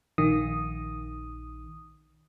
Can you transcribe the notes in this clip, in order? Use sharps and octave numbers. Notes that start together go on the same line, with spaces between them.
A#1 D#3 D#6